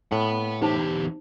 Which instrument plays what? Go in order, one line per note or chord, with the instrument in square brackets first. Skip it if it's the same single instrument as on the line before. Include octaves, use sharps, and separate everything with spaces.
[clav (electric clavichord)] A2 [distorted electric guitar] F#5 B5
[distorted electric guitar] E2 G4 [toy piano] D#4 C5 A5